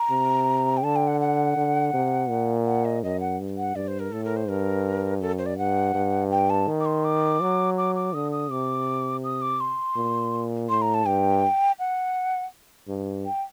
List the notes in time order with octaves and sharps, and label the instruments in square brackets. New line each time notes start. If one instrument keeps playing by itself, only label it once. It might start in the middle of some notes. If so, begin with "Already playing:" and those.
Already playing: [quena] A#5
[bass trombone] C3
[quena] G5
[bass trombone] D3 [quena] A5
[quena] G5
F#5
F#5
[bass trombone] D3
C3
A#2
[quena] F#5
D#5
[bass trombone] F#2 [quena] D#5
[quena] F#5
[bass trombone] G2
[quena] F#5
[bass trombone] G2 [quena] D5
[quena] C5
A#4
[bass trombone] A2 [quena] A4
[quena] A#4
C5
[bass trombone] G2 [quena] A#4
[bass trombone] F#2 [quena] A4
[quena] C5
D5
[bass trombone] G2 [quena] F#5
[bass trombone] G2
[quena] G5
A5
[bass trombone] D#3
[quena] D6
C6
D6
[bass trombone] F#3
[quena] D6
D6
[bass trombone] D3 [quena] D#6
[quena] D#6
[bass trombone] C3 [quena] D6
[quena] D#6
D6
C6
[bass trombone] A#2
[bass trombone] A2 [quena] C6
[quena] A#5
A5
[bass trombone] G2 [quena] G5
[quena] F#5
[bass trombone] G2
[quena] G5